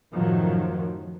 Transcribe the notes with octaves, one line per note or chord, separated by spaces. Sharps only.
F#2 A2 D#3 F3 F#3